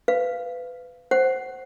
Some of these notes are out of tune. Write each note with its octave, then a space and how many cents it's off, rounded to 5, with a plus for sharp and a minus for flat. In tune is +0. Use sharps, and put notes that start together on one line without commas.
B4 +25 F5 -10
C5 +0 F#5 +10